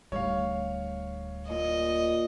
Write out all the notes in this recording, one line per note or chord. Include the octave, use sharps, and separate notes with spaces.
D1 G3 C#5 F5
A#2 D#5